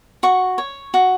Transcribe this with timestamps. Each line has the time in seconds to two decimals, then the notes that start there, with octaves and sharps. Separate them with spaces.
0.23 F#4 C#6
0.58 C#5
0.94 F#4